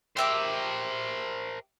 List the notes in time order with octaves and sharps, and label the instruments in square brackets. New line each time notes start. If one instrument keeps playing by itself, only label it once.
[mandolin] G4 E5 D6 [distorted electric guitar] A#4 C5